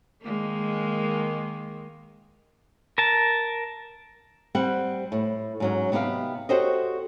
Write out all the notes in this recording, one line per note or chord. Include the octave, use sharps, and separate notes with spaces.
D#3 G#3 A#3
A#4 A5
G3 C4 G4 F#5
A2
G#2 F#3 C#4
C3 B3 D#4 G4 F5
F#4 G4 A4 C5 C#5 D#5